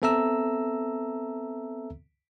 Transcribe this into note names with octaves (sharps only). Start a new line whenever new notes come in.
B3 C4 A4 E5 A#5 E6